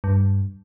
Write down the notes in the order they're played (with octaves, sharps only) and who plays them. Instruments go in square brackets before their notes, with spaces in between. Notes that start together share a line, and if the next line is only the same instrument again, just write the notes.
[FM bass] G2